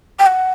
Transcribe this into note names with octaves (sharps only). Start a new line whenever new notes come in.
G5
F#5